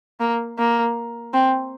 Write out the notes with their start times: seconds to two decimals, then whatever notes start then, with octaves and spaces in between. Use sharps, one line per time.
0.20 A#3
0.58 A#3
1.33 C4